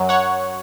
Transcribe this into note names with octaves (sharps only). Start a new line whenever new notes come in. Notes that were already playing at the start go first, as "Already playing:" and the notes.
Already playing: F#2 F#3
C#5 F#5